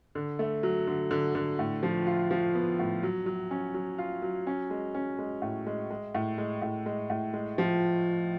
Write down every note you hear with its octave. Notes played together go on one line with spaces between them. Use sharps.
D3
A3
F#3
D3
D3
D3
A2
F3
F4
F3
B3
A2
F#3
F#3
C#4
F#3
F4
F#3
C#4
G#3
C#4
G#3
A2
G#3
G#3
A2
G#3
A2
G#3
A2
G#3
F3